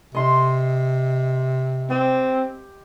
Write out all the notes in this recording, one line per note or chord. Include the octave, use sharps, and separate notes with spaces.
C3 D#5 C6
C4 G4